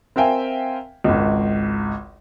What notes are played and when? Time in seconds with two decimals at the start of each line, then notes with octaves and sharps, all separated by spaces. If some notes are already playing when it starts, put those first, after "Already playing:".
0.16 C4 A#4 E5 F5 G5 G#5
1.04 G#1 C#2